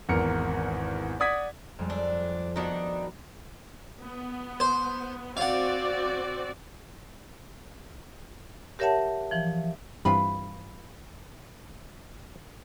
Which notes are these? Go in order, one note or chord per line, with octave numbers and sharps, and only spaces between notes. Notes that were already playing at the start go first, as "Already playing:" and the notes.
G#1 E2 A#4 C#7
D5 F#5 D#6 G#6 B6
F2 G3 G#3
D4 A4
D#3 B3 D4 D#4 F#4 A#4
B3
C5
C4 F#4 D5 F5 F#5
G4 A#4 C#5 E5 F#5 A5
E3 F3
G2 E3 B3 C4 F4 B5